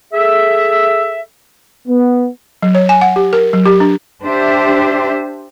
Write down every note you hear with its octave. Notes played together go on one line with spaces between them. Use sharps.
G#4 A4 E5
B3
F#3
C#5
G#5
F#5
G4
A#4
F#3
G4
D4
D4 G4 C5 E5